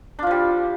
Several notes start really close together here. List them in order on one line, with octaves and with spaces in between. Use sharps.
D4 F4 F3 G3